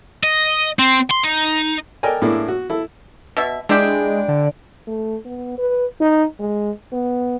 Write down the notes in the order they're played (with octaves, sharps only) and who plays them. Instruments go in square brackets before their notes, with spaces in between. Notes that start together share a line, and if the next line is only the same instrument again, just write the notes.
[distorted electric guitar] D#5
C4
C6
D#4
[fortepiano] A4 A#4 D5 D#5 G5 G#5
A2 A#3 D4 E4 G#4
F#4
E4 A4
[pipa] B2 E5
[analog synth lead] G#3 [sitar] D4 [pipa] E4 G4
[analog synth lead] D3
[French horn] A3
B3
B4
D#4
G#3
B3